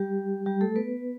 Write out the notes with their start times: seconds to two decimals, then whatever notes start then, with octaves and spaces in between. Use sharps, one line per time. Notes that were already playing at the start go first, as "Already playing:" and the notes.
Already playing: G3 G4
0.46 G3 G4
0.61 A3 A4
0.76 B3 B4